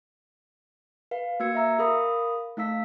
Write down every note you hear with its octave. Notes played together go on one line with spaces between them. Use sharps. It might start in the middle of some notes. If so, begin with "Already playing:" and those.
B4 F5
A#3 F#4 E6 G#6 C#7
E5 A#5 E6
G#4 A#4 F5 B5 D#6
A3 D#4 F5 E6 B6